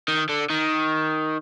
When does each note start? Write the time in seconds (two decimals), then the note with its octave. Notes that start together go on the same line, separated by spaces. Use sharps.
0.08 D#3
0.29 D3
0.50 D#3